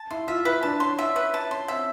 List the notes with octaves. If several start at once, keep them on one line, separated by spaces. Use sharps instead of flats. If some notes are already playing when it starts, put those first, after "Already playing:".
Already playing: A5
E4 C6
F4 E5
E4 B4
D4 A5
C#4 C6
E5
B4
A5
C#4 C6
C4 E5